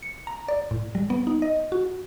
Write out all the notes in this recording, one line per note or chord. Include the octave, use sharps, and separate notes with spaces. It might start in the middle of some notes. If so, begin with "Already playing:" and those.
C#7
A#5
D5
A2
G3
B3
D#4
D#5
F#4